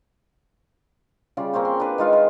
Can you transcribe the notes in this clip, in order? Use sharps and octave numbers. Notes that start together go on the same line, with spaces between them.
C#3 G3 F4 D5
A#3 C4 C#4 C5
C6
D4 B4
D#3 G#3 F4 F5
C6